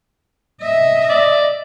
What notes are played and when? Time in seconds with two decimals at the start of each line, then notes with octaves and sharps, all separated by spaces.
0.61 D#5 E5
1.09 D5